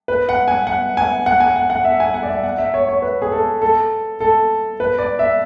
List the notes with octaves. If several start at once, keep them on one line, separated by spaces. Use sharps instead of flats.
B4
F#5
G#5
F#5
G#5
F#5
G#5
F#5
F#5
E5
G#5
F#5
D5
E5
F#5
E5
C#5
C#5
B4
G#4
A4
A4
A4
B4
D5
E5